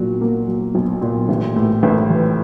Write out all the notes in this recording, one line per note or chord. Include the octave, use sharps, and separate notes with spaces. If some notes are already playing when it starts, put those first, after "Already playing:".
Already playing: B1 A#2 F#3 F#4
A#3
F#3
B1
A#2
A1
A2
A1
E3